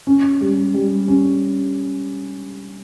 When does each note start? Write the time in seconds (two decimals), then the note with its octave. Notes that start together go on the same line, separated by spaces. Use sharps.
0.07 C#4
0.41 G3
0.74 G3
1.08 C#4